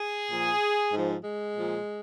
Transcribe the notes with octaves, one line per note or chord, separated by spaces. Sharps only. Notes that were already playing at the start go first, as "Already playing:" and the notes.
Already playing: G#4
A#2 F3
G#2 F3
G#3
A#2 F3